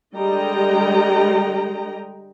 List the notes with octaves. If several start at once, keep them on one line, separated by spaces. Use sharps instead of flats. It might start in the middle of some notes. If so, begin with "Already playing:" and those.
D3 G3 G#3 D#5 G5 A#5